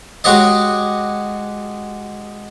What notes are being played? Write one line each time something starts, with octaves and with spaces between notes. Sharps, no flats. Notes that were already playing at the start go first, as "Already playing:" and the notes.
G#3 F#4 G4 C#5 D#5